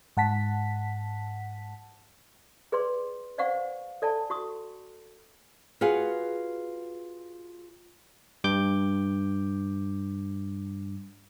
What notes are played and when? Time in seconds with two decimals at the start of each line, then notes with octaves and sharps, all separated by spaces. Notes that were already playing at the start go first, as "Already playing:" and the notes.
0.17 G#2 F#5 A5 B6
2.72 G#4 B4 D5 C6
3.38 C5 D5 F5 F#5 C#6
4.02 A4 D5 G#5 A5
4.30 F#4 C#6 D#6
5.81 F4 F#4 G#4 B4 F5 F#5
8.44 G2 D6 G6